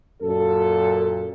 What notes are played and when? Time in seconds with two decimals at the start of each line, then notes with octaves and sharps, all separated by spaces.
0.22 F#2 A#2 A4